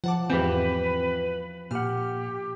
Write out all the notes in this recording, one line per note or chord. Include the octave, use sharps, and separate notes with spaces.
F3 F#5 A5 D6
E2 G#2 E3 C4 G4 B4
A#2 G4 F#5 F6